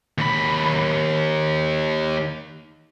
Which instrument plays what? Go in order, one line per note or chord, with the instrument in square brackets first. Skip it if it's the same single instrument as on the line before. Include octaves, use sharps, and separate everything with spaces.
[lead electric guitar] D#2 B5